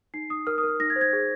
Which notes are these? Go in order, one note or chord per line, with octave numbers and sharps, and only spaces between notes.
D#4 C7
D#4 D#6
A#4 F6
D#6
A#4 F6
D#4 A#6
G#6
C5
G#6
G#4